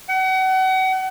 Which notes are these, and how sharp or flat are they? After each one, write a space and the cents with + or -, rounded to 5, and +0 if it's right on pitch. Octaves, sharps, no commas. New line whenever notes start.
F#5 +35